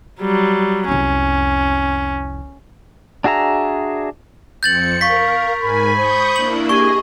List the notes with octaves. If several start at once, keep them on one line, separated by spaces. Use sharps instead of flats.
F#3 G3
C2 F2 C#4
D4 F#4 G#4 E5 A#5
F2 C4 G6 A6 C#7 F#7
A#4 F5 C#6 B6
G#2 A#4 G#5 B5
C5 C#6 D#6 G6
A#3 D4 E4 F#7
G4 G#4 D#5 G#5 C#6